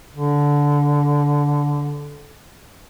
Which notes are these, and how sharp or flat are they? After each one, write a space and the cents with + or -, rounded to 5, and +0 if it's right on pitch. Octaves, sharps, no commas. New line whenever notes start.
D3 -15